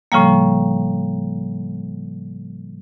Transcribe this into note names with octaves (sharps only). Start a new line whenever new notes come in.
A2 C#3 F3 G3 A#3